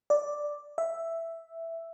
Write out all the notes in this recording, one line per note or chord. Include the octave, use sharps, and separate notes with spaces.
D5
E5